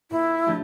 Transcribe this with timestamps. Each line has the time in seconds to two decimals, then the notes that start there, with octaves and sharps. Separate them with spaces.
0.11 A#2 E4
0.46 F3 A3 D4 G4